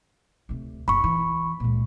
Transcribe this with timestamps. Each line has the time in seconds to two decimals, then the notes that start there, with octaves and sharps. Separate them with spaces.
0.49 D2 C3
0.88 F#1 B5 C#6
1.04 E3
1.60 C#2 A#2